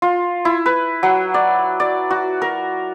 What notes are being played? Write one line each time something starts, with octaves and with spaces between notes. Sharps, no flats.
F4
E4
B4
F#3
D5
D5
F#4
A#4